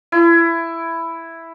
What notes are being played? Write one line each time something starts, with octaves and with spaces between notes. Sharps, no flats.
E4